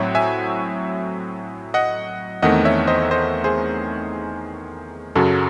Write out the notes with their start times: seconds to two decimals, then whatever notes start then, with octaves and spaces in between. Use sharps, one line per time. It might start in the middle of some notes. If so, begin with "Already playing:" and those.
Already playing: A2 F#3 C4 C#5 E5 F#5
0.15 E5 G#5
1.74 D#5 F#5
2.42 E2 D#3 A3 C4 D#5 F#5
2.65 C#5 E5
2.87 C5 D#5
3.11 C5 D#5
3.44 G#4 C5
5.15 F#2 C#3 F#3 F#4 A4